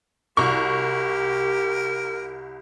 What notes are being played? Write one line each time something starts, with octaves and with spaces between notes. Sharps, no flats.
C2 F#4 G4 A#4 C#6